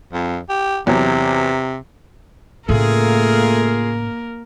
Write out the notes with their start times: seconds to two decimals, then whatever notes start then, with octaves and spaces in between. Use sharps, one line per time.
0.13 F2
0.49 G4
0.87 E2 C3 F#3
2.69 A2 C#3 A3 A#3 F4 G#4 A#4